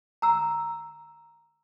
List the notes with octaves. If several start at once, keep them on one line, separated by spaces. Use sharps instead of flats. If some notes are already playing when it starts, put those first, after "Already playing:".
A#5 E6